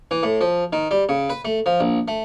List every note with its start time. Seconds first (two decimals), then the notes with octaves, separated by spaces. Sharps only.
0.11 E3
0.23 A2
0.41 F3
0.73 D#3
0.91 G3
1.09 C#3
1.30 B4
1.45 A3
1.66 F3
1.80 A#1
2.08 A3